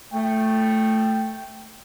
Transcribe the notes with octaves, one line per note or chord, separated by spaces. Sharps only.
A3 G5